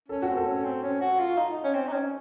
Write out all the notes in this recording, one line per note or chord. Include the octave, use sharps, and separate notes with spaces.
C#4 A4
F#4
C4
A4
C#4
C4
C#4
F#4
F4
D#4
C#4
C4
D#4
C#4